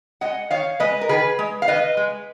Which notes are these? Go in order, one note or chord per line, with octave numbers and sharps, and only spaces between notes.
G#3 D#5 F#5
D#3 C#5 F5
G#3 B4 D#5
A#4
D#3 G#4 B4
G#3
F5
D#3 B4 D#5
G#3